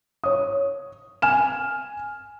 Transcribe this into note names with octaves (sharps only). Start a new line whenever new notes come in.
C#5 D#6
G#5 F6 E7